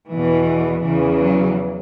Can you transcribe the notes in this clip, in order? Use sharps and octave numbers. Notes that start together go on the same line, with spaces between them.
E2 B2 E3
E2 C#3 E3
F#3